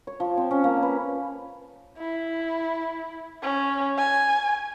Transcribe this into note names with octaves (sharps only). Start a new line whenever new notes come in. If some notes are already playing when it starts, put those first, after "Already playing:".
C#5
F3
C4
C#4
A#3
B4
E4
C#4
G#5